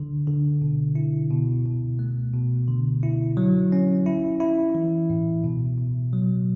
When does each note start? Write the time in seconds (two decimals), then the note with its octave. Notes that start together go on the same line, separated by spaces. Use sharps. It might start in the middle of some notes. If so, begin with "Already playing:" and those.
Already playing: D3
0.27 D3
0.62 B2
0.95 E4
1.30 B2
1.65 B2
1.99 A3
2.33 B2
2.68 D3
3.03 E4
3.37 F#3
3.72 C#4
4.06 E4
4.40 E4
4.75 E3
5.10 A2
5.44 B2
5.78 B2
6.13 F#3